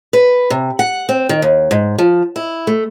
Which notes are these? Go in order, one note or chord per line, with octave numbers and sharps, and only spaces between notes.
B4
C3
F#5
C4
D#3
D#2
G#2
F3
E4
A3